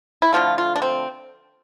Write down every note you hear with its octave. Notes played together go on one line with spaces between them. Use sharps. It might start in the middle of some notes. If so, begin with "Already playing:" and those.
E4
D3 F3 A3 F4
F4
D4
C4